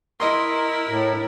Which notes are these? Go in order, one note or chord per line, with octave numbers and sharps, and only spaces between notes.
E4 A#4 D#5 C6
A2